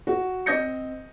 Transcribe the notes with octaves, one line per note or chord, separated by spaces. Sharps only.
F#4
C4 D#5 D#6 G6 A#6 C#7